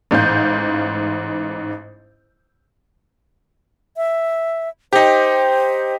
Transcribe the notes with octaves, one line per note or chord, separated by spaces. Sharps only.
A1 G#2 F5 G6
E5
D#4 G4 C5